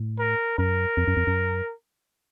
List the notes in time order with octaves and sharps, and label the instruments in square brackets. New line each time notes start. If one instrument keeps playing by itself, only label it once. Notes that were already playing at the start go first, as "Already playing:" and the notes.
Already playing: [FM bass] A2
[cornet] A#4
[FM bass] F#2 [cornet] A#4
[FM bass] F2
F#2
F2
F#2